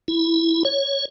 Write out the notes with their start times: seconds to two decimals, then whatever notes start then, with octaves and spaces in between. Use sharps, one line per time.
0.08 E4
0.65 C#5